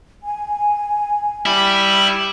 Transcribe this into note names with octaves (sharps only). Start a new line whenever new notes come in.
G#5
G3 E4